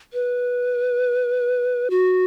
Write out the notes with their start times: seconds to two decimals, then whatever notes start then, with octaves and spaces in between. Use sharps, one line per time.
0.13 B4
1.90 F#4